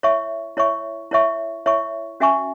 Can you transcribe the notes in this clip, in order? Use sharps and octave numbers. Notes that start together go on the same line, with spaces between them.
E4 C#5 E5 C#6
E4 C#5 E5 C#6
E4 C#5 E5 C#6
E4 C#5 E5 C#6
C#4 F#4 E5 G#5 C#6